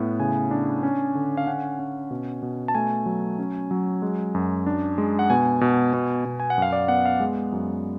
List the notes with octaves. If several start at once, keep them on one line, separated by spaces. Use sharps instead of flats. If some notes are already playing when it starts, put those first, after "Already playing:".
Already playing: A2 B3
C#3 G#5
D4
C#4
D3
F5
C#4 F#5
C#4
B2
B2
A5
A3 G#5
F#3
C#4
F#3
G#3
F#2
D4
G#3
F#5
B2 G#5
B2
B2
B2
G#5
F#5
F#2 F5
D5
B3 F#5
F5
G#3
F#2